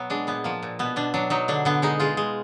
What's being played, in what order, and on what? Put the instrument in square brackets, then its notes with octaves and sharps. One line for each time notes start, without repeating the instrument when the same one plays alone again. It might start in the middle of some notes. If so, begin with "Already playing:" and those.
Already playing: [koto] B2 F#3 B3
G#3 D4
A#2 B3
F3 A#3
A#2
B2 B3
B2 D4
F#3 D4
F#3 D#4
D3 D4
D3 B3
G#3 D#4
G#3 F4
G#3